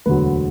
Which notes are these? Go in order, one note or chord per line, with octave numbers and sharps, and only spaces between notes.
E1 D2 D3 F#3 B4